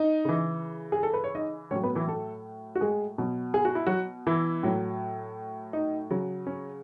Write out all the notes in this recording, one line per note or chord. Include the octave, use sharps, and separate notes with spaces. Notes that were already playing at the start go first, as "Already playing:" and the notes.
Already playing: D#4 D#5
C#3 E3
G#4
A4
B4
C#5
D#4 D#5
A2 F#3 C#4 C#5
B3 B4
E3 E4
A3 A4
F#4
G#3 G#4
B2 F#3
G#4
F#4
E4
F#3 F#4
E3 E4
A2 F#3
D#4
C#3 F#3
C#4